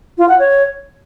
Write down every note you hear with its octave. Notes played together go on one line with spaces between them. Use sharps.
F4
F#5
C#5